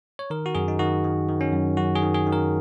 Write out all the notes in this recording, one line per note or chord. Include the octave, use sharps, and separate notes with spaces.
C#5
D#3 A#4
F#4
F#2 G#4
D#4
D#3 F#4
D#3
D#3
C#4
F#2
F#2 F#4
G#4
D#3
G#4
D#3
A#4